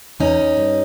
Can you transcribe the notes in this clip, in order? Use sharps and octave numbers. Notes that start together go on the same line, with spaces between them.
E2 C#4 D#4
E2
G2